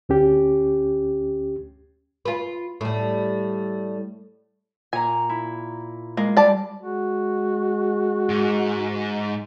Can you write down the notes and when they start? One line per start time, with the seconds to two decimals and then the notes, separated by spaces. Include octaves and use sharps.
0.09 D2 C#4 G4
2.25 F4 B4
2.81 A2 G3
4.93 A#2 G#5 A#5
5.29 E4
6.17 G#3 A#3
6.37 G3 D5 A5
6.82 G#3 F#4
8.29 G#2